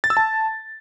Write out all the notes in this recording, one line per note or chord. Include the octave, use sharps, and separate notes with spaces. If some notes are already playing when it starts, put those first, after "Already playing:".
A6
E6
A5